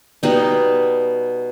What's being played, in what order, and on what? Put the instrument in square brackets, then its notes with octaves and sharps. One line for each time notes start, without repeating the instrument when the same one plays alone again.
[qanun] B2 G3 B3 D#4 D#5